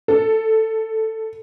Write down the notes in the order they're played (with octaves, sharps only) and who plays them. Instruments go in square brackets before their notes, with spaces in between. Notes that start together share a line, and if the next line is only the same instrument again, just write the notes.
[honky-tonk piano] A4